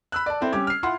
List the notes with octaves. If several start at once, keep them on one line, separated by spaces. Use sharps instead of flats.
B5 E6 F#6
D5 A5
C4 E4 A4
G3 C#4 G4 D6 G#6
F6 C7
E4 F4 E5 F#5 C6